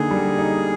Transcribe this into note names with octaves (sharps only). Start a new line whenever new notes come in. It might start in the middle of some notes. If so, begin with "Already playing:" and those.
Already playing: D3 A#3 D#4 G#4
G3
D#4